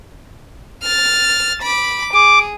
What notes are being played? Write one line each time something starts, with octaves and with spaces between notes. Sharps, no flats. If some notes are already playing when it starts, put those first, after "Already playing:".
F6 A6
B5 D6
G#4 D6